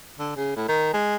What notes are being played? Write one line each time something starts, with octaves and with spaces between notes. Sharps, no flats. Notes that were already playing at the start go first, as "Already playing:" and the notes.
D3
C#3
A2
D#3
G#3